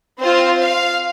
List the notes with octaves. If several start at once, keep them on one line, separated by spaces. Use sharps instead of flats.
C4 F4 C5
F5